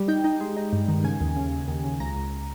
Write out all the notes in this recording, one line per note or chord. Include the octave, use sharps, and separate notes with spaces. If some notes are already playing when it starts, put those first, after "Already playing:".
Already playing: G3
D#4 G5
D#4
G#3
D#4
G2
D#3
C#3 G#5
D#2
C#3
D#2
D#2
C#3
C#2 A#5
C#2